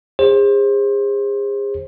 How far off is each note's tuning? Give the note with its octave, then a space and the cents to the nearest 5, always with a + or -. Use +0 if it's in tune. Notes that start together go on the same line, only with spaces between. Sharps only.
G#4 -40 C5 +30